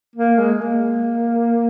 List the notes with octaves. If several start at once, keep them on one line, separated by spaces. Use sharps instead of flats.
A#3
G#3
A#3